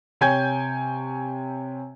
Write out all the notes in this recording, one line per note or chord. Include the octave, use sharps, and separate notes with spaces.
C3 C#5 G5 G#5 G6 G#6